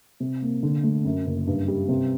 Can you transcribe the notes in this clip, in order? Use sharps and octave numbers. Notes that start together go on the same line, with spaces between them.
C3
A#3
D3
A3
F#2
F#1
G2
G3
C3